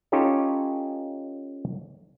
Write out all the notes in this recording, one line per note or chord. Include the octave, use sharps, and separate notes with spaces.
C#4 D#4 F4 G4 A4 C#5